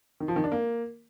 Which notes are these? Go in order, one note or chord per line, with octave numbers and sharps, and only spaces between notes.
D#3
F3
D#3
D4
A#3